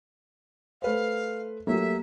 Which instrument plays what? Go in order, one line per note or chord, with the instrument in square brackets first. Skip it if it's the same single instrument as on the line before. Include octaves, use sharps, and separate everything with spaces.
[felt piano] A3 B4 C5 [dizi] F5
[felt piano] F#3 A3 [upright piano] A#3 G4 [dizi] E5